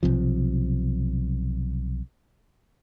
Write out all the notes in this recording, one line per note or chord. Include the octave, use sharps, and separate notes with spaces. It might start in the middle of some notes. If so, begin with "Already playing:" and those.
B1 C3 F3